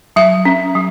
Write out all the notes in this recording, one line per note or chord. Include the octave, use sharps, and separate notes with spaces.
F#3 E5
C#4
F#3